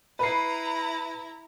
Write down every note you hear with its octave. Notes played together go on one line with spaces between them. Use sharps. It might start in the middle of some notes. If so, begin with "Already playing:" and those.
E4 B4 A#5 C7